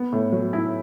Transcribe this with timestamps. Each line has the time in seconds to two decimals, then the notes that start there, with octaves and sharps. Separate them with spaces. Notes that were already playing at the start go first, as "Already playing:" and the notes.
Already playing: B3
0.12 A2
0.32 F#3
0.53 E4